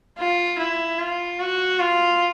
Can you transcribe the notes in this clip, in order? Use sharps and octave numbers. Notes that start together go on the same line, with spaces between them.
F4
E4
F4
F#4
F4